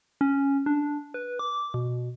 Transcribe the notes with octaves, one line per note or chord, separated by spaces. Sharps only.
C#4
D4
B4
D6
B2